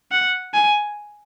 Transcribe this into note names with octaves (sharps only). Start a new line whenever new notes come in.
F#5
G#5